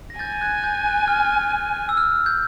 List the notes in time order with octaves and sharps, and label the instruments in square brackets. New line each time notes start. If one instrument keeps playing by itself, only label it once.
[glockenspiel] A#6
[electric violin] G#5 [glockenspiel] G6 A6
[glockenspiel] F#6 G#6
G6
F#6
F6
E6
F6
G6